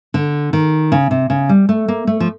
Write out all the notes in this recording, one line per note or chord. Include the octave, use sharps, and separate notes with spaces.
D3
D#3
C#3
C3
C#3
G3
A3
A#3
A3
F3